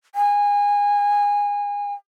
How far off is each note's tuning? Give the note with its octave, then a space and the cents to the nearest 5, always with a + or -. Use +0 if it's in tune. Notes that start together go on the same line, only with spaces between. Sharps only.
G#5 -25